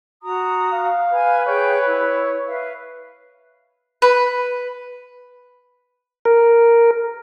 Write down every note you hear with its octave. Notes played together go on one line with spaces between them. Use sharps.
F#4 A#5 D#6
F5
B4 G#5 G#6
G#4 C#5 G5 G6
E4
B4 E5 F5
B4
A#4